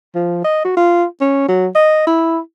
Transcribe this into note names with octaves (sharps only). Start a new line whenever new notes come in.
F3
D#5
F#4
F4
C#4
F#3
D#5
E4